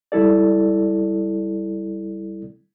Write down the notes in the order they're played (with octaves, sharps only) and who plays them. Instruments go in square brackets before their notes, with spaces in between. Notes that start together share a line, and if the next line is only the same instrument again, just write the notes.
[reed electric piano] C#2 G3 E4 A4 D5